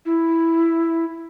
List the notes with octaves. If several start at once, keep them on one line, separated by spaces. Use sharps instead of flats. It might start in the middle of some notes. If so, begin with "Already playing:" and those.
E4